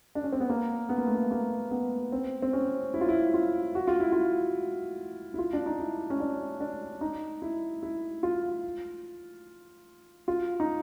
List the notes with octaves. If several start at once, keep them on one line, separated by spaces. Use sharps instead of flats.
D4
C#4
C4
B3
A#3
B3
A#3
A3
A#3
A#3
B3
C4
C4
C#4
E4
F4
E4
F4
F#4
F4
E4
F4
E4
F4
D4
D#4
E4
C#4
D4
D4
D#4
E4
E4
F4
F4
D#4